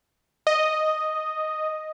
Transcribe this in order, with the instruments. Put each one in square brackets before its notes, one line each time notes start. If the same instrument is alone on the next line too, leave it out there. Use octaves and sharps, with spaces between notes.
[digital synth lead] D#5